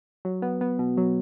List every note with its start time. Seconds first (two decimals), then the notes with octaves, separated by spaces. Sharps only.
0.25 F#3
0.42 B3
0.61 B3
0.79 B2
0.97 F#3